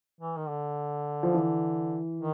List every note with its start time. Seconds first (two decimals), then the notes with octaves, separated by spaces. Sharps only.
0.20 E3
0.37 D#3
0.48 D3
1.23 F3
1.34 E3
2.19 D#3